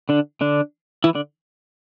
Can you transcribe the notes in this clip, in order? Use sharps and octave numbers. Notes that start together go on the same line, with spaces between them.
D3 D4
D3 D4
E3 E4
D3 D4